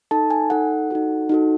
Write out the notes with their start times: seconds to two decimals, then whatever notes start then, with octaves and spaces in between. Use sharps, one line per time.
0.11 D#4 A4 A5
0.30 G#5
0.50 D#4 A4 F#5
0.90 D#4 F#4 A4
1.29 D#4 F#4 A4